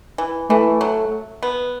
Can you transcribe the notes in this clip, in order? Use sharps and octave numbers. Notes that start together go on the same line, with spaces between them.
E3
E3 A3
F#3
B3